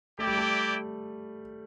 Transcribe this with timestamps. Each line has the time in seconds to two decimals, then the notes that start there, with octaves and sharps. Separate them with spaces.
0.18 A3 E4 G4 D5 G5
0.27 G3
0.38 A3